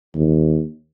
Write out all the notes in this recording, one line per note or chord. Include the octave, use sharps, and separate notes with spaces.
D#2